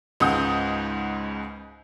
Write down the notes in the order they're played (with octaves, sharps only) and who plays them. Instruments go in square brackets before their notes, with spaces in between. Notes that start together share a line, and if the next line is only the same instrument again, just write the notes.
[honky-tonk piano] C#2 G#2 C#3 F#5 D#6 G6